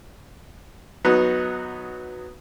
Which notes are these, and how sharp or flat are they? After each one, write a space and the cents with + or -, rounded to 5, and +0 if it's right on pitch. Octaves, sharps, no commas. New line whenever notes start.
F#3 -10 B3 +0 D#4 +0